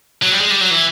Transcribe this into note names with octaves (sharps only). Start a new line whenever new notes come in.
F#3
G3
G#3
G3
F#3
E3